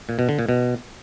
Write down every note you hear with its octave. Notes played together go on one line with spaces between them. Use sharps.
A#2
B2
D3
A#2
B2